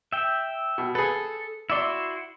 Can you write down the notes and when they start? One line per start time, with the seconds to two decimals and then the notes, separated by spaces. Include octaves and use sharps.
0.12 E5 G5
0.78 B2
0.95 G#4 A4 B4
1.70 E4 F#4 D5 E5 C6